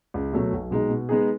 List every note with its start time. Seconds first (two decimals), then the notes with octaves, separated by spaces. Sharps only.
0.14 C#2
0.33 B2 F#3 A3
0.53 B1
0.71 B2 G#3 D#4
0.90 B2
1.09 G#3 B3 D#4 G#4